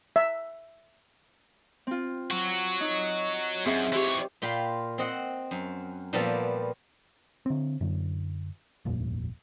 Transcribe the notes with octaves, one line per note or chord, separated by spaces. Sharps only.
E5
C4 F4
F#3 F#4
D#4
F#2 C4 G#4 E5
E3 G4 C5 C#5
A#2 F4 G5 B5 C6
C4 D#5 F#5
F#2
A#2 F3 G3 A#3 B3 A4
D3 C4
F#2 D3
D#1 G#1 F2 A#2